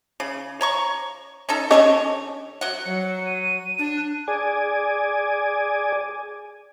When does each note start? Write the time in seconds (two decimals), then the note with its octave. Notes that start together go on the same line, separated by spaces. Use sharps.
0.20 C#3
0.61 C#5 A#5 C#6
1.49 C#4 D#4 A4
1.71 D3 C#4 A4 C#5 D#5
2.61 F#3 F#5
2.85 F#3 C#7
3.26 D#7
3.78 D4
3.97 F#6
4.28 G#4 D5 G#5